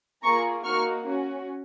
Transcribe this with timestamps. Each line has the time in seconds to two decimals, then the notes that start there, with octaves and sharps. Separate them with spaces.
0.23 A#3 F4 G#4 A#5 C#6
0.64 A#3 D#4 F#4 C#6 F6
1.06 C#4 F#4